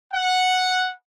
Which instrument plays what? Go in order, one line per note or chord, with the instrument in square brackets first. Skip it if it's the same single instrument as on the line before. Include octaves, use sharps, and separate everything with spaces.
[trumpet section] F#5